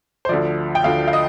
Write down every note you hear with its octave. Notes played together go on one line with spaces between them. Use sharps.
C5
D2 D3 F3 D5
G5
D2 D3 F3 F5
F5
D#5